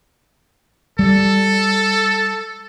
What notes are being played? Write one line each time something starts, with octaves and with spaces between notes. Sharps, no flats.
G3 A4